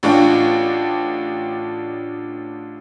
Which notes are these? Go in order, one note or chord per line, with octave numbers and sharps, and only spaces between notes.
A1 D4 F4 G5